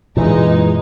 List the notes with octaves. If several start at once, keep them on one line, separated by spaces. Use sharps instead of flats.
F#2 A#2 E3 G#3 D#4